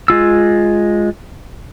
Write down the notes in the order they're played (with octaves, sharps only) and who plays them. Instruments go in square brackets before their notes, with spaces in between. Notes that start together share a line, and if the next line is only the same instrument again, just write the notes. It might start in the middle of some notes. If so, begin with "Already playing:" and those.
[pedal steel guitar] G#3 F4 E6